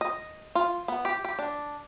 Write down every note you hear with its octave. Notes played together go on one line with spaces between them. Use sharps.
D#5
F4
B3
G4
G4
D4